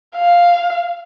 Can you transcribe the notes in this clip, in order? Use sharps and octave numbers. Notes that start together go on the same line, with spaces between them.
F5